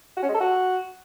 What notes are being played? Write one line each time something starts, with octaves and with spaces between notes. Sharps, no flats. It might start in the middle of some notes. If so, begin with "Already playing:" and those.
F#4
C#4
G#3
A4
F#4